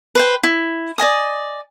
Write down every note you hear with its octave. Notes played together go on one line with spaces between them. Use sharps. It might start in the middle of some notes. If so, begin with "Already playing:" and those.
B4 C5 G5
E4
D5 D#5 G#5 D#6